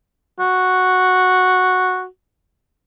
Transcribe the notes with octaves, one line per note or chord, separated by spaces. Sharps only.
F#4